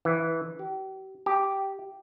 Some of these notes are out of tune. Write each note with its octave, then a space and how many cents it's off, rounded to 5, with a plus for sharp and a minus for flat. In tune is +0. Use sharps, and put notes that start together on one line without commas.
E3 -10
G4 -40
G4 -5